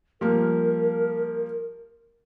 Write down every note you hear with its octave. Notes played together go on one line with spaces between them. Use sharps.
F3 G3 A#3 A#4